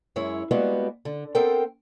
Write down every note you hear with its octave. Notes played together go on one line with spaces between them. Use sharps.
F#2 G#3 E4 C#5
G3 G#3 A#3 B3 F#4
D3
B3 C4 A4 A#4 C5 G5